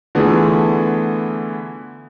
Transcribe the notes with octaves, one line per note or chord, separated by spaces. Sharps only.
D3 E3 A3 B3 F4 G#4